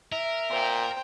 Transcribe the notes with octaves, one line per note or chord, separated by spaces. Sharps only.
A#4 E5
A#2 C5 G5